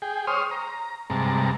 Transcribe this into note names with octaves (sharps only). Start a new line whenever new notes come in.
G#4 G5
C5 C#5 C6 D#6 F6
A#5
G2 C3 G#3 A5 A#5